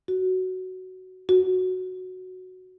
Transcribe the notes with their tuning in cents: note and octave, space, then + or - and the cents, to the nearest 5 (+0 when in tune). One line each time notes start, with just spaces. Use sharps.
F#4 +10
F#4 +0